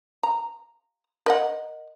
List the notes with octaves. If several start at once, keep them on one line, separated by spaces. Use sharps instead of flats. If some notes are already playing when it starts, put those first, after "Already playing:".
A#5
A#4 D#5 F#5